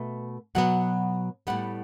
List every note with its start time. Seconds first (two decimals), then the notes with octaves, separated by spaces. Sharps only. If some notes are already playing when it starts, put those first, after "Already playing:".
Already playing: B2 A3 B4
0.55 B2 F#3 B3 F#5
1.47 A2 G3 B3 F#5